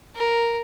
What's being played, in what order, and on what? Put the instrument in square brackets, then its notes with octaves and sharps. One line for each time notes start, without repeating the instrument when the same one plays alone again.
[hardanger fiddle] A#4